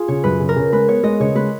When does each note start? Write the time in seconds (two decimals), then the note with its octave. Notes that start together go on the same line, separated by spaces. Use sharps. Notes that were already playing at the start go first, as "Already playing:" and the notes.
Already playing: F4 G#4
0.08 C#3 C#5
0.24 F#2 B4
0.40 C#3
0.49 A#4
0.56 C#3
0.73 G#3 B4
0.88 B3 C#5
1.03 G#3 D#5
1.20 C#3 C#5
1.35 G#3 B4